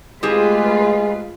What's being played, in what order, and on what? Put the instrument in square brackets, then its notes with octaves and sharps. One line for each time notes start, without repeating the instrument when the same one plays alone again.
[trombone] G#3 [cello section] A3 F4 B4 [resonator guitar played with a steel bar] C4 G4 G#4